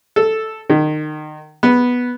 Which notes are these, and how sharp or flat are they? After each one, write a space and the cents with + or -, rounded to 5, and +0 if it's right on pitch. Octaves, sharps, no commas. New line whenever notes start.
A4 +0
D#3 -30
B3 -5